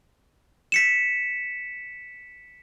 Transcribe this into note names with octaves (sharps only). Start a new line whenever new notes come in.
B6 C#7 E7